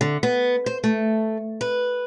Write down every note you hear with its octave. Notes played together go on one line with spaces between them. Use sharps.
D3
B3
C5
A3
B4